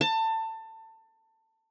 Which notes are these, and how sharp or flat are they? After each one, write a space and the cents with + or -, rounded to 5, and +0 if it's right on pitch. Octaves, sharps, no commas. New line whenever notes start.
A5 +25